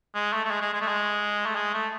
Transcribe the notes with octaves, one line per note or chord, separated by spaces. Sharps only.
G#3
A3
A3
G#3
G#3
G#3
A3
G#3
A3
G#3
A3